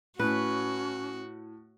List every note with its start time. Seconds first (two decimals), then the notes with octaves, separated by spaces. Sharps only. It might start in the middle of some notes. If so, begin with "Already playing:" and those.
0.19 A2 C#4 F#4 B4